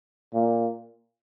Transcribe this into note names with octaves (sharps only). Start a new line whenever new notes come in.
A#2